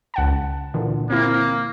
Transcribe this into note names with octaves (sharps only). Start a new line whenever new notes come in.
C#2 F#5 A5
A#2 D3 E3
A#3 C4 E4